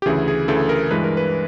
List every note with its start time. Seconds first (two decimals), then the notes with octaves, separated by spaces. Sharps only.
0.02 G4
0.06 D2 C#3 E3 G#4
0.28 G#4
0.48 D2 C#3 E3 A4
0.69 A#4
0.91 G2 E3 G#3 B4
1.04 A#4
1.17 B4